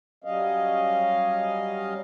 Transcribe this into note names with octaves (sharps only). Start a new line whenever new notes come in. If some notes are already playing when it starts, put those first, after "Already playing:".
F#3 G3 C#4 D#5 F5